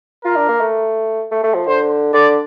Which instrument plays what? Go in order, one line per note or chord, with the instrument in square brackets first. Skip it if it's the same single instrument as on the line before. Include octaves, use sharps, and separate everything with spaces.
[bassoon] F4 [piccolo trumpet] A#4
[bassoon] D4
A#3
A3
A3
A3
F3
[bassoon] D3 [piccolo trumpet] C5
[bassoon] D3 [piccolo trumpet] D5